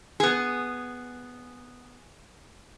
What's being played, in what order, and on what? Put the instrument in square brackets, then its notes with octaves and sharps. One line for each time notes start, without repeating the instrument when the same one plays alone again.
[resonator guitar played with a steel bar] B3 G#4